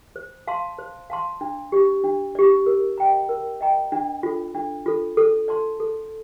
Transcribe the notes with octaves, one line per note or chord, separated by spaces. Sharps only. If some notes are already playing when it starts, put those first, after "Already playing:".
C5
F5 A5 C6
C5
F5 A5 C6
D4
G4 D5
D4
G4 D5
A#4
D#5 G5 A#5
A#4
D#5 G5 A#5
D4
F4 A4
D4
F4 A4
A4
D5 A5 C6
A4